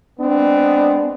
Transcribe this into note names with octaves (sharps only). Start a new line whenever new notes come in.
G#3 B3 C4 D4